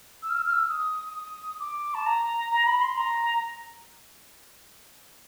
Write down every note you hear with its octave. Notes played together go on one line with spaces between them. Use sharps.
E6
F6
E6
F6
E6
D#6
D#6
D6
A5
A#5
A#5
B5
C6
A#5